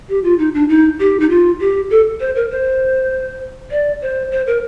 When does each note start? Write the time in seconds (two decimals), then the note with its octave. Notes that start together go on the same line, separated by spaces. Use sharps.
0.09 G4
0.24 F4
0.39 D#4
0.54 D4
0.69 D#4
0.99 G4
1.20 D#4
1.30 F4
1.60 G4
1.90 A4
2.20 C5
2.36 A#4
2.50 C5
3.71 D5
4.02 C5
4.31 C5
4.47 A#4